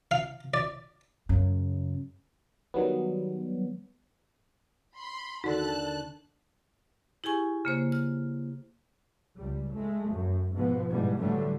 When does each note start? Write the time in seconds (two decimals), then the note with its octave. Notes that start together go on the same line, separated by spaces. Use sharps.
0.11 F5
0.54 D5
1.29 F#2 C#3
2.74 D#3 F#3 G3 B3
4.96 B5 C6
5.44 D#2 D3 D#4 F#4 A4 D5 A5 F#6
7.24 E4 G4 G#4 G#5 C#6
7.65 C#3 A#3 C5
7.92 F6
9.35 C#2 G3
9.73 G#3 A3
10.10 F#2
10.54 G#2 B2 F3 B3
10.90 G#2 B2 E3 G3
11.19 A2 D3 E3 F#3 G3 A3